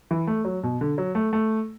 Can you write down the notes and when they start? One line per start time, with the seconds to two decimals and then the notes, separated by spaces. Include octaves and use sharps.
0.11 E3
0.27 A3
0.45 F#3
0.63 B2
0.81 D3
0.98 F#3
1.15 A3
1.33 A3